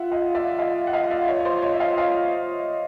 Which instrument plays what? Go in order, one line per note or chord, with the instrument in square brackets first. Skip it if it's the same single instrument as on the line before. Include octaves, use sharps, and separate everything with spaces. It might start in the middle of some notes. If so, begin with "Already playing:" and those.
Already playing: [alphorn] F4 [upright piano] E5 F#5
[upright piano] D#5 F5
D5 E5
D#5 F5
F#5
D#5 F5
D5 E5
C#5 D#5
C#5
C5 D5
C#5 D#5
E5
D#5 F5
D#5 F5